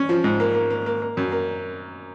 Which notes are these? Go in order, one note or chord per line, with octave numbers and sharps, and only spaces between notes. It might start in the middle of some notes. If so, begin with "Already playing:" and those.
Already playing: C#4
F3
G#2
A#3
A#3
A#3
A#3
A#3
F#2
A#3